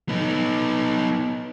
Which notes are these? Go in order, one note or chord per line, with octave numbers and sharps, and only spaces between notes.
B3 D#4